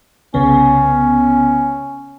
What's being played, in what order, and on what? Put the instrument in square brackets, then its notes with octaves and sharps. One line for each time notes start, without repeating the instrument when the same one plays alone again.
[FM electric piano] C2 C#3 B3 [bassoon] C#4